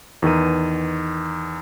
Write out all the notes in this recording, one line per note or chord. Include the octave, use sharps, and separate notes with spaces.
E2 D#3 B4 D#7